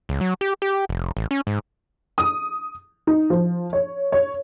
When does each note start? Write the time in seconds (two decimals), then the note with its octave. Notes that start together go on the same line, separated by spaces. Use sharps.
0.09 C#2
0.21 F#3
0.41 G4
0.62 G4
0.89 F1
1.17 A1
1.31 C#4
1.47 G#2
2.18 D#6
3.07 D#4
3.30 F3
3.73 C#5
4.12 C#5